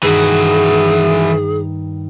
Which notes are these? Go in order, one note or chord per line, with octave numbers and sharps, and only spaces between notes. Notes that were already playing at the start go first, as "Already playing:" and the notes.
G2 D#3 E3 F#4 G#4